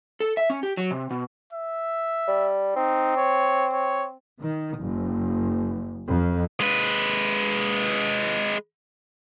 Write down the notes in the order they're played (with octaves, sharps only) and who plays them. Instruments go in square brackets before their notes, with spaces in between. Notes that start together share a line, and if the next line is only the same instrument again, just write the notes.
[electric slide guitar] A4
E5
C#4
G4
F#3
C3
B2
[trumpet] E5
[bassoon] G3
[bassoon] C4 [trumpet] D#4
[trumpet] C#5
C#5
[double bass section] D#3
F#1
F2
[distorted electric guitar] G#3 B4